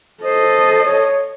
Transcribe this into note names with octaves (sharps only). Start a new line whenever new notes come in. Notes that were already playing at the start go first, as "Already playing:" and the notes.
A4 C5 D#5
C#5